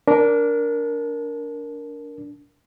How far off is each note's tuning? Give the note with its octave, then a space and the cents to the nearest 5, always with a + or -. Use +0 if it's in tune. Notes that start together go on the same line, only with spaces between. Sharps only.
D4 -20 A#4 +0